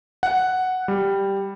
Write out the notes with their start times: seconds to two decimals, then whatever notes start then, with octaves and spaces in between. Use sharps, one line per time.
0.23 F#5
0.88 G3